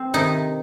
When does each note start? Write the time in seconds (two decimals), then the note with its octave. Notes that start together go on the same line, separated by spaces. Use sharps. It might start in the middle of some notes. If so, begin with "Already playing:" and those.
Already playing: C4
0.14 C3 D#3 D#4